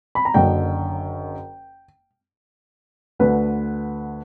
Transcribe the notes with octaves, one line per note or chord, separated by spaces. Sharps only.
B5
A#5
F#1 F#2 D3 G5
D2 D3 B4